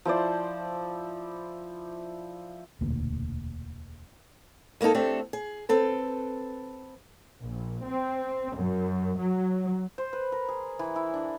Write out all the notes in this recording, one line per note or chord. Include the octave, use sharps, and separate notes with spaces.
F3 E4 C5 D5
E1 D2 A#2
G#3 A#3 D4 D#4 A4
A3 C4 D4 G4 A4
G#4
C4 A4 B4
A#1
C4
F#2
F#3
C5
B4
A#4
G#4
E3
E4
D4